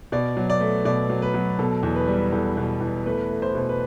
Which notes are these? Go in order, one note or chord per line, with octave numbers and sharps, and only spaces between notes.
B2 D5
F#3
D5
A3
B2 D5
F#3
B4
F#3
B2 A4
E2
B4
G3
E2 A4
B2
E2
A3 B4
A3
C5
B2 C5
B4